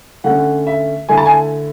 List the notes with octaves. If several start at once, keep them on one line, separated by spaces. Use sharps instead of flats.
D3 A3 C#4 F#5
E5
D3 A3 E4 G#5
A5
G#5